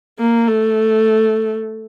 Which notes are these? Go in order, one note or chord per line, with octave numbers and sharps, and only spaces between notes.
A#3
A3